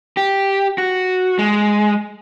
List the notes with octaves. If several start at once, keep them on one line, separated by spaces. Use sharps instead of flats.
G4
F#4
G#3